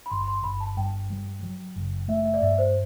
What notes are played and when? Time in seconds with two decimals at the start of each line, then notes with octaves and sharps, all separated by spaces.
0.06 B5
0.11 G1 C6
0.27 C6
0.44 G1 B5
0.60 A5
0.77 G2 G5
1.10 G3
1.43 F#3
1.76 F#1
2.08 A3 E5
2.25 E5
2.34 D5
2.42 G2 E5
2.58 C5